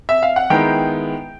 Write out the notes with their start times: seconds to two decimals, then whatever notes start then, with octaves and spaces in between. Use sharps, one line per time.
0.09 E5
0.23 F5
0.36 F#5
0.50 D#3 G#3 B3 E4 G5